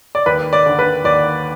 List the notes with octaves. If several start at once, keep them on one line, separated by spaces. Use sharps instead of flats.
D5
D#2 B4
D5
D3
B4
D#2 D5